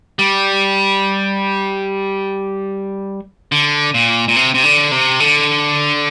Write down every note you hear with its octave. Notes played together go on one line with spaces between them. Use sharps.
G3
D3
A#2
A#2
C3
C3
D3
C3
D3